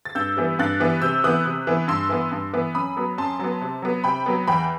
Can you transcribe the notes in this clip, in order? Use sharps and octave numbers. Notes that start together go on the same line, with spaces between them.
A6
G2 E6 G6
E3 G3 B3
G2 F#6 A6
E3 G3 B3
C3 E6 G6
E3 B3 D#6 F#6
C3
E3 B3
G2 C6 E6
E3 B3
G2
E3 B3
F#2 B5 D#6
F#3 B3
F#2 A5 C6
F#3 B3
C3
F#3 B3
C3 G5 B5
F#3 B3
E2 G5 B5